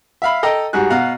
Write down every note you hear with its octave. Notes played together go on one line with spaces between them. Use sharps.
E5 F5 B5
A4 D#5 G5 A#5
G#2 G3 F#4 G#4 F#6
B2 F5 F#5 A#5 F#6